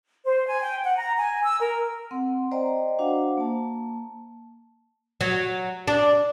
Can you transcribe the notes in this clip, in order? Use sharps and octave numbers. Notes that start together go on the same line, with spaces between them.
C5
G#5
G5
F#5
A#5
G#5
E6
A#4
C4 F#5 C6
C5 D5 D#5 G5 A#5
D4 F#4 C5 F5 F#5
A#3 A5
F#3
D4